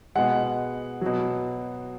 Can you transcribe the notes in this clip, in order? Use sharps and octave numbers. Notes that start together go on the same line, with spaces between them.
B2 G#3 F#5
B2 F#3